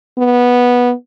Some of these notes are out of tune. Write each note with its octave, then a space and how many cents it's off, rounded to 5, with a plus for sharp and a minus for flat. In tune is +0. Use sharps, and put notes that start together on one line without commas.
B3 -10